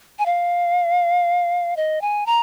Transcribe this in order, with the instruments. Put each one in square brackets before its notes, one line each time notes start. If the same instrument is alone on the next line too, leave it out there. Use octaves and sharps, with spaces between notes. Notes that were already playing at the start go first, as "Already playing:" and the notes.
[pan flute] G#5
F5
D#5
G#5
A#5